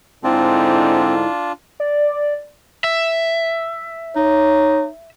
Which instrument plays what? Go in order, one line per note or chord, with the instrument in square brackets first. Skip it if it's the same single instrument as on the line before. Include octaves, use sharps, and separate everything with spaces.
[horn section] G#2 D3 [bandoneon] C4 [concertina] D4 F4 [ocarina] E4
[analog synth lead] D5
[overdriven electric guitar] E5
[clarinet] D#4 [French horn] C#5